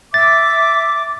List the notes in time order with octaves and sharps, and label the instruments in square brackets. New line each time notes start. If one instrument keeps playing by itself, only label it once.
[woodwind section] E5 D6 [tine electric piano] A6